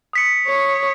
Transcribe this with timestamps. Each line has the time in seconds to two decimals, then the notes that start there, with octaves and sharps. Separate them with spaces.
0.13 D#6 B6 C#7
0.47 C#5